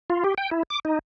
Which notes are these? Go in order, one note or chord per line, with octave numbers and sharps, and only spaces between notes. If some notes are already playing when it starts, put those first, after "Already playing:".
F4
G4
G5
E4
D6
D#4